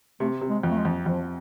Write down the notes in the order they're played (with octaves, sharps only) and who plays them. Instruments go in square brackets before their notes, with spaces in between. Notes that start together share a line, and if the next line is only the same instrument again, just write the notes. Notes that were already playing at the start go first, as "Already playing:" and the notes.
[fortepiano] C3 [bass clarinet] A3
[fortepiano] C3
[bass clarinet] G#3
[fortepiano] F2
[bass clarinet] A3
G#3
[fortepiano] F2
[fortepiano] F2 [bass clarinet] F3